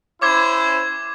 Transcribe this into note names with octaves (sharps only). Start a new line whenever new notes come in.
C#4 E4 C5 D6 G#6